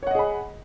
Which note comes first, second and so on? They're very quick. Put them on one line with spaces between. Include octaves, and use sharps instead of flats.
C#5 F#5 D#5 G#4 B5